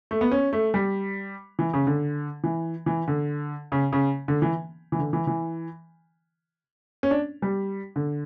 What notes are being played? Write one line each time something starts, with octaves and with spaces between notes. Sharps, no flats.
A3
B3
C#4
A3
G3
E3
C#3
D3
E3
E3
D3
C#3
C#3
D3
E3
E3
D3
E3
E3
C#4
D4
G3
D3